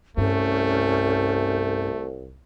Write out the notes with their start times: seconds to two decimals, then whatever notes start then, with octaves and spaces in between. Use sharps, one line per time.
0.17 C2 G2 A3 C#4 A4 G6